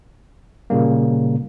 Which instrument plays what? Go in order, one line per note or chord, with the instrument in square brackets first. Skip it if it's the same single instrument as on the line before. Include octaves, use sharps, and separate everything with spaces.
[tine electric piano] A#2 C#3 G3 A#3